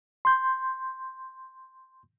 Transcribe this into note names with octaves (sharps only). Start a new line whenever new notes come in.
C6 G6